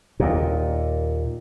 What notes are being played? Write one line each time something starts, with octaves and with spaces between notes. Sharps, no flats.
D#2 A#2